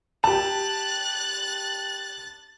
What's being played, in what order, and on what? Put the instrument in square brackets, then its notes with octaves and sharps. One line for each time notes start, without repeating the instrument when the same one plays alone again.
[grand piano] G4 A5 [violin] F#6 A6